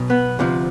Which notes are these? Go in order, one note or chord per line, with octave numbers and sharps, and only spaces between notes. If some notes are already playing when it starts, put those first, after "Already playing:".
Already playing: B1 B2
B3
D2 C3 F3